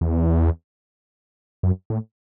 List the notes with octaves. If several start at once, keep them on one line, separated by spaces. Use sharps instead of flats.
E2
F#2
A2